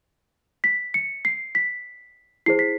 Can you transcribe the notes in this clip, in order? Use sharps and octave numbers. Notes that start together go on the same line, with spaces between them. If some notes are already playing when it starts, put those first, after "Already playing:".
B6
C#7
C7
B6
E4 G#4 C5 C7
B6